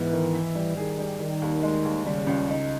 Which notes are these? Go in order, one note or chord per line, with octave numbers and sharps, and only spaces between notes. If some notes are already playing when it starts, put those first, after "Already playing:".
Already playing: G#2 E3 B3
D#3
E4
G3
D#3 G#4
G3
D#3 G3
D#2
G#3
D#2
C#3 G3
C#2
D#4